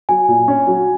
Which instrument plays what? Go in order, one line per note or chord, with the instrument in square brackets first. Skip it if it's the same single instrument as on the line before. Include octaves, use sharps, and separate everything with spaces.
[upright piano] F#3 [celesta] G#5
[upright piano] A#2
C#4
F#3